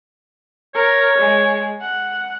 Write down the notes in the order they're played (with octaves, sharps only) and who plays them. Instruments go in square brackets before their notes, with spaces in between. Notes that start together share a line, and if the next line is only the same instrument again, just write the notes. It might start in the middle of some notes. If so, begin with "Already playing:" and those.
[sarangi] A#4 [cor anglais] C#5
[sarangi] G#3
F#5